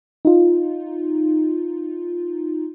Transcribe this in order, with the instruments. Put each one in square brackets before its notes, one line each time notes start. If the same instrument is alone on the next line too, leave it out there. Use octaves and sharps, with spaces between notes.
[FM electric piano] D#4 F4